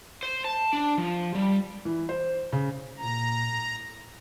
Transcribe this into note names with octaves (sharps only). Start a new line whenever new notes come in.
C5
A5
D4
F3
G3
E3
C5
C#3
A#2 A#5
A2